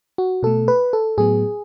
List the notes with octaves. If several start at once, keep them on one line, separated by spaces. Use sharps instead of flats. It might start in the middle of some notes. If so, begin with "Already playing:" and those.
F#4
B2 A3 A4
B4
A4
A2 F#3 B3 G#4